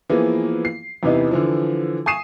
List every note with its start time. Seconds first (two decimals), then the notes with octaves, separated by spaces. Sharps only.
0.09 E3 F3 A#3 B3 G#4
0.65 C7
1.03 E2 C3 E3 B3 D#4
1.31 D3 E3 F3
2.06 G#5 C#6 D#6 C7 D#7 E7